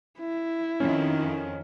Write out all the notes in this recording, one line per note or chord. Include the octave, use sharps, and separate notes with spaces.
E4
F2 D#3 C#4